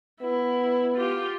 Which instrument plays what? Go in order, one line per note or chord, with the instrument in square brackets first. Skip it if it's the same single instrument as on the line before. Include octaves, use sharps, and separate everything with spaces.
[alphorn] B3 [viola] E4
[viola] F4 G4